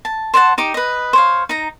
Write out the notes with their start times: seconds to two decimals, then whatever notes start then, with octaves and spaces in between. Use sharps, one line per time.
0.05 A5
0.34 C5 D5 F#5 A5
0.58 D#4 G4 D6
0.74 B4 D#5
1.13 C5 C#5 F5
1.49 D#4 A#5